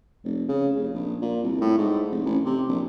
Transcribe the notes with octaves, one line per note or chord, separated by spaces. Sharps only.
F1
C#3
F1
A#1
A#2
C2
A2
G#2
F1
A1
C3
A#1